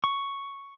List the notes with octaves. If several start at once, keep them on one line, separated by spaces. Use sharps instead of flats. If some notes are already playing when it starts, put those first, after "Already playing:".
C#6